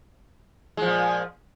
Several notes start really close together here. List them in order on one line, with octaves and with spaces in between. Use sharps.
G#3 F3 A#2